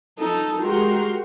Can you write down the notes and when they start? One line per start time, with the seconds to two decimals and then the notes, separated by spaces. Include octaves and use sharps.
0.19 D#4 A4
0.62 G#3 F#4 G4 A#4 C6